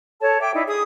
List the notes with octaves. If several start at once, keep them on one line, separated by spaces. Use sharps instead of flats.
A4 C#5 A5
E5 G5 D6
D#4 E4 D5
G#4 D#6